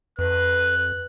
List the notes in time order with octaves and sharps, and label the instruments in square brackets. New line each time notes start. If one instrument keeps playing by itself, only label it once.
[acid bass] F2 [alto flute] B4 [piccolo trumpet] F#6